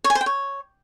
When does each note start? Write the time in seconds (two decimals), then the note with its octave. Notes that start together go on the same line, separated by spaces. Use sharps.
0.04 C#5
0.10 G#5
0.15 C5
0.21 G5
0.26 C#5